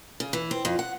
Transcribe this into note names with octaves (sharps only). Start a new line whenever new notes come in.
C#3
E3
C4
F2
F#5